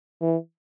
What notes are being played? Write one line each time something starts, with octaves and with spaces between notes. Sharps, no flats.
E3